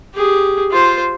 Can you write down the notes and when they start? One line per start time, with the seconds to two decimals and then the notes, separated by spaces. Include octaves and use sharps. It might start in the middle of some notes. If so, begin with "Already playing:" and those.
0.14 G4 G#4
0.71 F4 C5